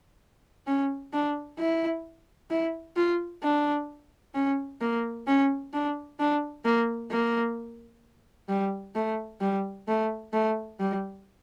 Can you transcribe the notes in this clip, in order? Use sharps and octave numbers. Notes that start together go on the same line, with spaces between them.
C#4
D4
E4
E4
F4
D4
C#4
A#3
C#4
D4
D4
A#3
A#3
G3
A3
G3
A3
A3
G3